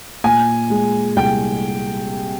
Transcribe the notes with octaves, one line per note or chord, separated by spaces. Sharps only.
A#2 G#5
G#3
C2 G5